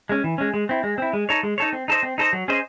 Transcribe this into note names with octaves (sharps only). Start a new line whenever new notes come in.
G#3 C#4
E3
G#3 C#4
G#3
C4 E4
G#3
C4 E4
G#3
D#4 A4 C#5
G#3
D#4 A4 C#5
C4
D#4 A4 C5 D#5
C4
D#4 A4 C5 D#5
F#3
C#4 G#4 C5 D#5